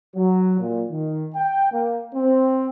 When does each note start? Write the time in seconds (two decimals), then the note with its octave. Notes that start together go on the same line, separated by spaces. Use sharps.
0.16 F#3
0.60 A#2
0.90 D#3
1.35 G5
1.72 A#3
2.15 C4